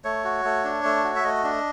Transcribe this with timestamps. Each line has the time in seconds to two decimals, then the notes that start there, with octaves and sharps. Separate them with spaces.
0.04 A3 C#5
0.25 F#4
0.45 A3
0.65 D4
0.84 A3
1.04 F#4
1.16 E5
1.24 A3 D#5
1.44 D4